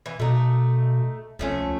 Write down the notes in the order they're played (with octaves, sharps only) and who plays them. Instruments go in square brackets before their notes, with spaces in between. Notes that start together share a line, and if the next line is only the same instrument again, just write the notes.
[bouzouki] E3
[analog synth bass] B2 [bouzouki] A3 D#4
[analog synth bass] C#2 [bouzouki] F3 A3 C#4